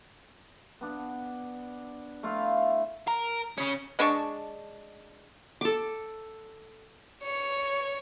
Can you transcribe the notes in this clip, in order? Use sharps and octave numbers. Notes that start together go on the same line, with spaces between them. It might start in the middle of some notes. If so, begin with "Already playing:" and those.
B3 D4
A3 E4 F4 F5
A#4
C#3 C#4
G#3 D4 A5 C#6
A4 D6
C#5 C#7